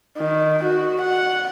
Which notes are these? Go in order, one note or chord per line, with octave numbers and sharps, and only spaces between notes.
D#3
F#4
F#5